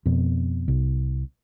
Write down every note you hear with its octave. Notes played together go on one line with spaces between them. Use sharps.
F2 B2
C2